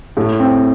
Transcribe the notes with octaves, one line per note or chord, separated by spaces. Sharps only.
A2
C4